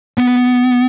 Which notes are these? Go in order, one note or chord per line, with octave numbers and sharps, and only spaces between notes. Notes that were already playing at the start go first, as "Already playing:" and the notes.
B3